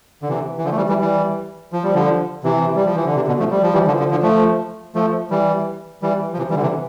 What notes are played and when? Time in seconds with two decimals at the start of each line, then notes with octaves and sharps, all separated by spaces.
0.22 D3
0.29 C3 E3
0.58 E3
0.65 D3 F3
0.71 A3
0.77 E3 G3
0.89 E3 G3
1.01 E3 G3
1.72 F3
1.84 G3
1.94 D3 F3
2.44 C3 E3
2.76 G3
2.86 F3
2.95 E3
3.06 D3
3.16 C3
3.27 B2 D3
3.39 F3 A3
3.51 G3
3.63 F3
3.74 E3 G3
3.87 D3 F3
3.99 D3 F3
4.11 D3 F3
4.23 F3 A3
4.95 F3 A3
5.30 E3 G3
6.02 E3 G3
6.33 F3
6.38 C3 E3
6.50 E3 G3
6.56 D3
6.62 C3 E3